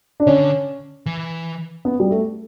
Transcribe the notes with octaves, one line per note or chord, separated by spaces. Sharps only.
D4
D3 C#4
E3
B3
G3
A3